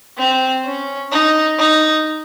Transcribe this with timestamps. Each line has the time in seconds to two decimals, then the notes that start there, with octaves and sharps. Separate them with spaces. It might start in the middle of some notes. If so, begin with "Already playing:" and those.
0.18 C4
0.65 C#4
1.12 D#4
1.59 D#4